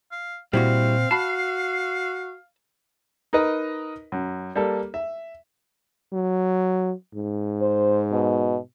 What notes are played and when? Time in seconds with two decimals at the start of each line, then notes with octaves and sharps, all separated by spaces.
0.12 F5
0.53 A#2 G3 C4 E4 F#4 F5
1.11 F#4 A5 B5 C7
3.33 D#4 A#4 B4 D#5
4.12 F#2
4.55 G3 A#3 A4
4.94 E5
6.13 F#3
7.15 G#2
7.61 C5
8.12 B2